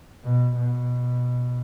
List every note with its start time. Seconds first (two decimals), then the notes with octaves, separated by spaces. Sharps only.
0.24 B2
0.56 B2